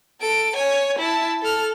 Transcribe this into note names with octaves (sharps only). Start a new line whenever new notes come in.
A4 D7
C#5 G#5
E4 A5
A4 F6